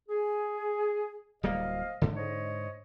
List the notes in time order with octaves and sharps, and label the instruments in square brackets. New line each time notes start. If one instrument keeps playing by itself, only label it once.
[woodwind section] G#4
[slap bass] D1 G3 A#3 [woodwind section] C5 D#5 F5
[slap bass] G#2 D3
[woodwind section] C5 C#5 D#5